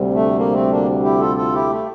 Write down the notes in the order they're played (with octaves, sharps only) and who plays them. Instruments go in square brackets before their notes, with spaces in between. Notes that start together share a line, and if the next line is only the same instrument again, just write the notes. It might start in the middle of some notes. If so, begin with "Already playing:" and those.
Already playing: [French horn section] D2 C3 G3
[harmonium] A3
A#3
A3 C4
A#3 D4
E4 G4
F4 A4
F4 A4
E4 G4
A3